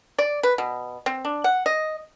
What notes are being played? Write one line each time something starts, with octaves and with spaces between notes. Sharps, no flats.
D5
B4
B2
C4
D4
F#5
D#5